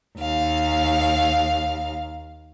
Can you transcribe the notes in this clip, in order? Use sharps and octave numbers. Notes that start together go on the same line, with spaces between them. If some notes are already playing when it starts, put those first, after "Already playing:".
D#2 F5